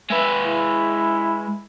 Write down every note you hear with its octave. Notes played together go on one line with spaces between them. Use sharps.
G#3 B4 E5
E4